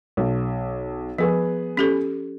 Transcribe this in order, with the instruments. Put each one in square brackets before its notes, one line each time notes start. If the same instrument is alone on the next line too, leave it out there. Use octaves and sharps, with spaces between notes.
[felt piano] B1
[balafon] F3 [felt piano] B3 G#4 B4
[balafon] C#4 G4 A4